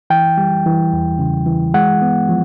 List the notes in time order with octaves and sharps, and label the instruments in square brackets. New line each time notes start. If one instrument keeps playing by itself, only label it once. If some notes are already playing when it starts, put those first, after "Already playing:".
[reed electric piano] E3 G5
G3
E3
E2
C#3
E3
G#3 F#5
B3
F3